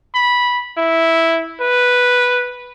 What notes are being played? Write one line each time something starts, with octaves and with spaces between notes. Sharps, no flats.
B5
E4
B4